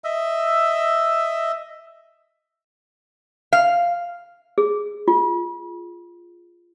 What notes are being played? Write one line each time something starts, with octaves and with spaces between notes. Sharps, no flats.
D#5 E5 E6
F5
G#4
F4